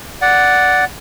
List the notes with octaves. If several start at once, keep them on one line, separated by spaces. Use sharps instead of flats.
D5 F#5